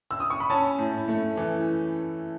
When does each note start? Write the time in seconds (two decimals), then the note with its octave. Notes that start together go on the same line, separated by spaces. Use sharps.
0.11 E6
0.20 D#6
0.30 C#6
0.40 B5
0.50 C#4 A5
0.79 A2
1.08 A3
1.37 E3